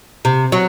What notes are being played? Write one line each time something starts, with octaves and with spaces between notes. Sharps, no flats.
C3
F#3